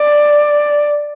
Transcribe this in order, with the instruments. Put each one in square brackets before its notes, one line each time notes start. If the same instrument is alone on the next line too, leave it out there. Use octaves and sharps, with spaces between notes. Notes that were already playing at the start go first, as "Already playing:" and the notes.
Already playing: [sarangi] D5